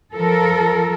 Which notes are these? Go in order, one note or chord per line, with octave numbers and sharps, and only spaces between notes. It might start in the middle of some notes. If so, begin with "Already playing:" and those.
F3 A4 A#4